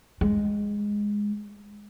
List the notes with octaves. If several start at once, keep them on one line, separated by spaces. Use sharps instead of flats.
G#3